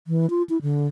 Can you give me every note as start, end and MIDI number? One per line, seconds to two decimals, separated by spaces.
0.07 0.29 52
0.30 0.43 65
0.49 0.61 64
0.62 0.87 50